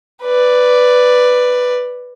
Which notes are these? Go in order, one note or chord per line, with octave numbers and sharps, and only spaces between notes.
B4 D5